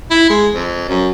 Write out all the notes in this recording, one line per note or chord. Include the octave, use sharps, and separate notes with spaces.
E4
G#3
F2
F#2